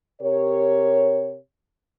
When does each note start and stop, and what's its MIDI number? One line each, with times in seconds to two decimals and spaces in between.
0.22 1.37 48
0.22 1.37 67
0.22 1.37 70
0.22 1.37 73